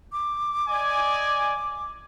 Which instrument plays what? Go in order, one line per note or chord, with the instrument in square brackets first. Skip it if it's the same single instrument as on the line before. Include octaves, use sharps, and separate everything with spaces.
[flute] D6
[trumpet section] D5 D#5 G#5